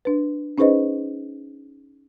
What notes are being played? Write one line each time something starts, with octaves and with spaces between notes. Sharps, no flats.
D4 B4
C#4 D#4 G#4 B4 C5 D#5